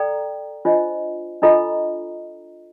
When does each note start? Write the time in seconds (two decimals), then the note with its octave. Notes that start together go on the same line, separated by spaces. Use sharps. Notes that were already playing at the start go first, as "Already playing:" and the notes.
Already playing: A4 D5 G5 A#5
0.65 D4 F4 C5 D#5
1.42 D4 F4 A4 D#5 A#5